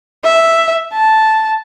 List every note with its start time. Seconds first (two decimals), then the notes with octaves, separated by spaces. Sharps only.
0.24 E5
0.93 A5